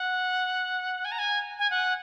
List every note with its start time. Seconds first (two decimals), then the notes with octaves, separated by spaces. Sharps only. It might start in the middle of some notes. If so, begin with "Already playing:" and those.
Already playing: F#5
1.05 G#5
1.12 A#5
1.19 G#5
1.59 G#5
1.71 F#5